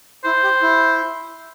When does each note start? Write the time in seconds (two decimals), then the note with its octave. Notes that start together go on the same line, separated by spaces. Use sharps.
0.24 E4 C5
0.43 G4
0.62 E4